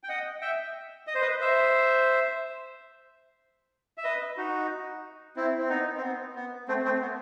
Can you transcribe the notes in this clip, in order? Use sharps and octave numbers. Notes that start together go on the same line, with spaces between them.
G5
D#5 F#5
E5 G5
D#5
C5
B4 D#5
C5 E5
E5
B4 D#5
D#4 F#4
C4 E4
C4
B3 D#4
C4
B3
B3
A3 C4
A3 C4
B3